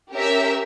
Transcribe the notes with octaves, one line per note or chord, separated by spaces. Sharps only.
C#4 G4 A#4 E5